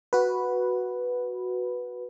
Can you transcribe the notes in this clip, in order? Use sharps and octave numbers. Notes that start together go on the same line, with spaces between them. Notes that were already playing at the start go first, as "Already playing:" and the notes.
F#4 B4